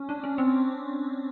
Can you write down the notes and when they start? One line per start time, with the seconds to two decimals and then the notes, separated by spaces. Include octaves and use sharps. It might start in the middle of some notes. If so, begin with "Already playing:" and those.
Already playing: C#4
0.09 D4
0.24 C#4
0.38 C4